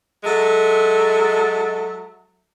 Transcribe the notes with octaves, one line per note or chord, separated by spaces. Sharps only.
F#3 G#3 A4 E5